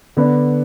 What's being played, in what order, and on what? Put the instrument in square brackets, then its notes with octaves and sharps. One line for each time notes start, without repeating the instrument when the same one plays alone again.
[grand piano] D3 B3 D4